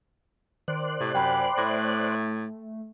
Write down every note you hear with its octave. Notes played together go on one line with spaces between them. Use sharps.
D#3 C5 D5 F#6
A2 C3
F#2 G5 B5 C6
A2 A3 A#6